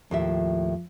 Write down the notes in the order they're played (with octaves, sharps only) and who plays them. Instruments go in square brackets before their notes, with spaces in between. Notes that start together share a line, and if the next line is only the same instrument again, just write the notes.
[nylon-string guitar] D#2 A2 E5 [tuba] F3